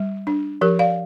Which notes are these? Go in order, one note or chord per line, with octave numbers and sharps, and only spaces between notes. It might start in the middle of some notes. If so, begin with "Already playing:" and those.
Already playing: G3
D4
F3 G4 A#4
D5 F5